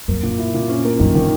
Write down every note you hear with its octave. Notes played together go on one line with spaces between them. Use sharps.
F#2 A#3
A#2
E4
A#2
C#4
A#3
F#2 D#3
D#3